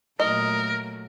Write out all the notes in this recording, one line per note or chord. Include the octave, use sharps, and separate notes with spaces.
A#2 F#3 A3 A#4 D#5